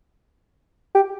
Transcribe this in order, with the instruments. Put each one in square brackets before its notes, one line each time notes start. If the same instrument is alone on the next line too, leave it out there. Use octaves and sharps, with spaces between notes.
[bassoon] G4